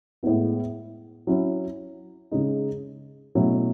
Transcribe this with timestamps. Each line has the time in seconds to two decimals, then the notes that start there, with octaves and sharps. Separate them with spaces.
0.23 A2 G#3 B3 E4
1.27 F#3 C#4 E4
2.31 C#3 G#3 D#4
3.35 B2 F#3 A3 C#4 E4